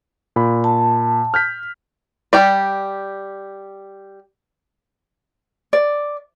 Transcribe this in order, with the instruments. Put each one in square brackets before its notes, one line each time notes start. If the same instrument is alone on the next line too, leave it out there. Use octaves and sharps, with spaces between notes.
[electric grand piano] A#2 B5
[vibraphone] A5
[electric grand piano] F6 G6 B6
[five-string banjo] G3 G4 D5
[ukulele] D5